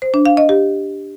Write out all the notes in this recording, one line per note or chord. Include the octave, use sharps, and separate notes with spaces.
C5
D4
F5
D#5
G4